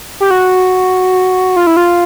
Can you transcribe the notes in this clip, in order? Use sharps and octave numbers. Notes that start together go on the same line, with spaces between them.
G4
F#4
F4
E4
F4